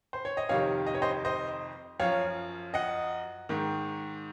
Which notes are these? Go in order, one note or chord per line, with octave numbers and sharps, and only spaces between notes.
C5
C#5
D#5
F2 C3 D#3 C#5 F5
D#5
C#5
C5 D#5
C5 D#5
F#2 F3 C#5 F5
D#5 F#5
G#2 D#3